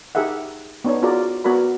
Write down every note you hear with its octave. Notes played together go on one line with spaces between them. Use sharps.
D#4 G4 G#4 A#4 E5 F#5
B3 D4 D#4 C#5
F4 F#4 G#4 A#4 D5
B3 F#4 A#4 D5 B5